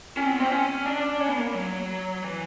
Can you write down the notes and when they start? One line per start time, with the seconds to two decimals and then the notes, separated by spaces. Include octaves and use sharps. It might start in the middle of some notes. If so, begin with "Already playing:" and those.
0.17 C#4
0.25 C4
0.32 B3
0.40 C4
0.52 C#4
0.86 D4
1.20 C#4
1.29 B3
1.38 A#3
1.54 F#3
2.24 E3